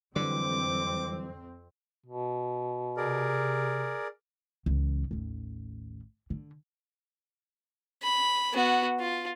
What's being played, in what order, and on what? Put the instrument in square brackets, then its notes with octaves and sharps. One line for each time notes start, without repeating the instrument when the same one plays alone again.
[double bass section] F2 C4 [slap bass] D3 [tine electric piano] E3 F#3 G3 [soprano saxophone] D6
[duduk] B2
[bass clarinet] C3 [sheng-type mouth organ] G#4 A#4 D5
[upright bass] C#2 E3
A1 D#2
D3
[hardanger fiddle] B5
B3 F#4
F4